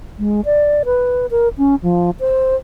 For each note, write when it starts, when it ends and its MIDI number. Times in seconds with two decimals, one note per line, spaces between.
0.19 0.41 56
0.45 0.83 74
0.85 1.26 71
1.31 1.49 70
1.58 1.75 61
1.83 2.10 53
2.20 2.56 72